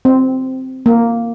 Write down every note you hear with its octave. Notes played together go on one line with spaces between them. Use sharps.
C4
A#3